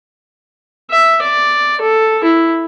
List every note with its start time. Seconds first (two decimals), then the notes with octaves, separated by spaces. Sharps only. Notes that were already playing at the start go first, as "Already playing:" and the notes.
0.91 E5
1.23 D5
1.81 A4
2.24 E4